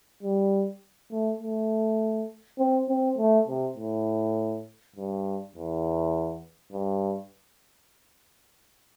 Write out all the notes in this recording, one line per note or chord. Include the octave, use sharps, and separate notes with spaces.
G3
A3
A3
C4
C4
A3
C3
A2
G2
E2
G2